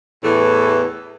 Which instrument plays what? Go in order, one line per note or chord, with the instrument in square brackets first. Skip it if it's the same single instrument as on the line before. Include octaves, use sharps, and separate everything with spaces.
[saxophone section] E2 A2 E3 A3